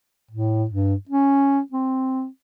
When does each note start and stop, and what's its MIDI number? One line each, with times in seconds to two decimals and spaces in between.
0.31 0.65 45
0.71 0.94 43
1.09 1.60 61
1.72 2.26 60